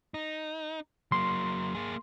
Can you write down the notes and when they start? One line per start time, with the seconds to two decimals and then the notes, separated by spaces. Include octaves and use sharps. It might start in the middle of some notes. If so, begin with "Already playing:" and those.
0.14 D#4
1.12 F#3 A#3 C6
1.75 A#3 G#4